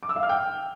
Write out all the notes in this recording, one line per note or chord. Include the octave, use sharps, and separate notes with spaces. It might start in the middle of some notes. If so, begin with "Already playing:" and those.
D6
E6
F5
F6
G5